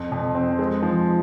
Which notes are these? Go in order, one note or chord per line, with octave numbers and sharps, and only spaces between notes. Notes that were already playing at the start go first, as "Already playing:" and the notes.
Already playing: F2
F2
C4
G#3
F3